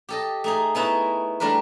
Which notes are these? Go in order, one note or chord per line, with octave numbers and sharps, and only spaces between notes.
G4 A4 D#5
A3 D#4 G#4
B3 D#4 E4 B4 C#5
G3 A3 D4 A#4 B4